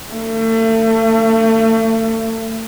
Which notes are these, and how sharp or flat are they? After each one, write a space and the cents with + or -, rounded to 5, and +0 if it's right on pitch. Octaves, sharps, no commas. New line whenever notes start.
A3 +35